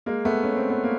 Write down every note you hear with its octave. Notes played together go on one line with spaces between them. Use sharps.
G#3 A#3
A3 B3
C#4
C4
B3
A#3